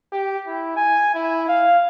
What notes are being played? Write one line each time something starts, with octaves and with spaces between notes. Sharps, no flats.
G4
E4
G#5
E4
F5